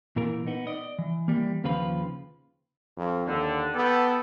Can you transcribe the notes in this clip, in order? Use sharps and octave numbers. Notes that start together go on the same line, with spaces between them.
A#2 E3 A#4
B3 D#4
D5 D#5
E3
E3 G3 A#3
D#2 C#3 F3 F4 B4 B5
F2
D#2 D3
B3 G4 A4